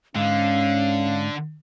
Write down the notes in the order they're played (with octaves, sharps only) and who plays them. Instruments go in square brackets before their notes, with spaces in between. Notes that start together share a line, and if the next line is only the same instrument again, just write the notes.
[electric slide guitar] G#2 [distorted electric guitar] D3 [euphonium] C#4 [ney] F5